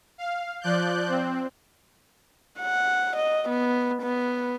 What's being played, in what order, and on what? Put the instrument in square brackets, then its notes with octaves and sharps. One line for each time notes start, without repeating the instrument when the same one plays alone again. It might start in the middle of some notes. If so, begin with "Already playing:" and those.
[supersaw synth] F5
F3 D5 F#6 G6
C4
[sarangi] F#5
D#5
B3
B3